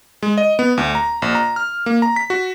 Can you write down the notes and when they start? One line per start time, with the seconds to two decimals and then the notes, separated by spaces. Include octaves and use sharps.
0.23 G#3
0.38 D#5
0.59 B3
0.78 D2
0.95 A#5
1.22 A#1
1.35 A#5
1.56 F6
1.86 A#3
2.02 A#5
2.16 B6
2.30 F#4